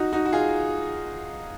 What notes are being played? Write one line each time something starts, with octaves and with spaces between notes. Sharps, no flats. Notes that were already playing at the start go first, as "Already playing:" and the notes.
Already playing: D#4 F#4
D#4 F#4
F#4
F4 G#4